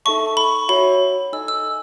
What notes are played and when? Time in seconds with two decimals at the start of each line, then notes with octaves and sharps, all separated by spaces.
0.05 D#4 A4 E5 A5 C#6
0.37 B5
0.69 F#4 C#5 E5 B5
1.32 D#4 A4 D#5 G#5 E6
1.48 E6